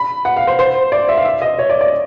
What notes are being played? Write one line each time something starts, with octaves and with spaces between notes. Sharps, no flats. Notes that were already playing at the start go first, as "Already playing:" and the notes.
Already playing: B5
F#5
F5
C5
C5
D5
E5
F5
E5
D#5
C#5
D5
D5